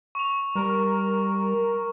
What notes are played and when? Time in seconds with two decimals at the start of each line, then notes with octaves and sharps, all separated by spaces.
0.15 C#6 F7
0.55 G3 A#4